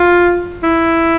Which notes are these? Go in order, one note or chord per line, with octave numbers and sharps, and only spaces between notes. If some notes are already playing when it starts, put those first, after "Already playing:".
Already playing: F4
E4